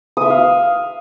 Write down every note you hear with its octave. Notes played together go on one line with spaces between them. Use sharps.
E5 F5 D#6 E6